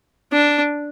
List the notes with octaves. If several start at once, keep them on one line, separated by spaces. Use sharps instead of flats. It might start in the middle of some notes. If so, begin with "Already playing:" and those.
D4